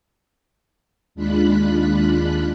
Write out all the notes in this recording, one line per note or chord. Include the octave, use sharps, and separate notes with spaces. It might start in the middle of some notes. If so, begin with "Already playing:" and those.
D#2 G#3 D4 F4 B5 F#6